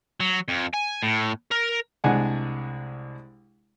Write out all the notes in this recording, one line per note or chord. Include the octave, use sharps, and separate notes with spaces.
F#3
F2
G#5
A2
A#4
C2 G#3 D4 F#5 G#5